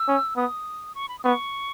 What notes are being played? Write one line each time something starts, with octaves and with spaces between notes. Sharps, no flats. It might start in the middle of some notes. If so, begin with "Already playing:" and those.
Already playing: E6
C#4
B3 D#6
C#6
B5
D#6
B3 C#6